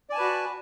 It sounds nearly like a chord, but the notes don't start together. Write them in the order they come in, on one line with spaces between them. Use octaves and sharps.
D5 G#5 A5 B4 F#4